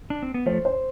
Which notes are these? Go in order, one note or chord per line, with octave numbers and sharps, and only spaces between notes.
D4
C4
B3
F3 A3 C5
C5